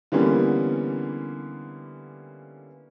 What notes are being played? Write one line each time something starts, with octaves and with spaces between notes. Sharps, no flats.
D3 E3 G3 A#3 B3 C#4